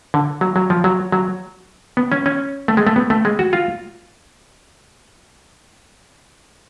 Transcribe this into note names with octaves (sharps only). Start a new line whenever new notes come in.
D3
F#3
F#3
F3
F#3
F#3
B3
C#4
C#4
A3
G#3
A3
B3
A3
G#3
F#4
F4